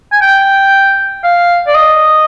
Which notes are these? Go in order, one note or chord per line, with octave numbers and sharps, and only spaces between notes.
G#5
G5
F5
D5
D#5